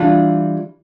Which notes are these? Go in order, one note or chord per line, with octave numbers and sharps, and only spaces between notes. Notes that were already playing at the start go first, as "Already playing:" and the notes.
Already playing: E3 G3 D4 F4